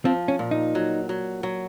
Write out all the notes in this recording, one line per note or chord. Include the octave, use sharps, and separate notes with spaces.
F3 C4
C#4
A#2
D#4
F#3
F#3
F#3